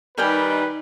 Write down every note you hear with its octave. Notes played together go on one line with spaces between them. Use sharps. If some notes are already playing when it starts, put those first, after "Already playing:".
D#3 G3 D#4 A#4 B4 G5 G#5